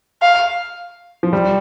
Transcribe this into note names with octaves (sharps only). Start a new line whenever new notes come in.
F5
F3
G3